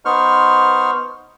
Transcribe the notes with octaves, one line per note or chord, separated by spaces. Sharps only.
B3 D#4 C5 C#6 F6